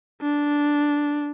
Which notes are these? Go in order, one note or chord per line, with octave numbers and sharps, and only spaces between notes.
D4